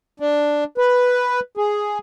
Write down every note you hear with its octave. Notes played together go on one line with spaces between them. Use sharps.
D4
B4
G#4